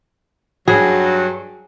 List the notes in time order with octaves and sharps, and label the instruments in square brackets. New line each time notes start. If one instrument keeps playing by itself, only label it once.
[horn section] G2 F#3 [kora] G#4